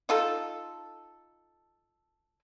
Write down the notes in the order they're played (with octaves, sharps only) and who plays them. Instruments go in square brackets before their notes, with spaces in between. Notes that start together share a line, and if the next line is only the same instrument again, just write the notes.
[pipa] D#4 F4 A4